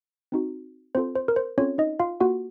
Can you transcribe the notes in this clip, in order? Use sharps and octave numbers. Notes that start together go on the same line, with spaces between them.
C4 D#4 F#4
C4 F4 A4 C5
C5
A#4
C5
C4 C#4 F4 A4 C#5
D#4 D#5
F4 F5
A#3 F4 F#4 A4 F#5